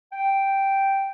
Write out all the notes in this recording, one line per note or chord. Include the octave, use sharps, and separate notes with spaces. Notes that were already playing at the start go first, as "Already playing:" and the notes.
G5